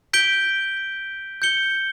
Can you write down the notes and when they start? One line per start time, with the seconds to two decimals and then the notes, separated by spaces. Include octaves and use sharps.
0.13 G6 B6 D7 G7
1.42 G6 C#7 G7